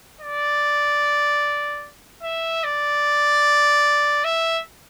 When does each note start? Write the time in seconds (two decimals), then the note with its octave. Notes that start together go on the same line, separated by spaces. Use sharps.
0.21 D5
2.23 E5
2.64 D5
4.24 E5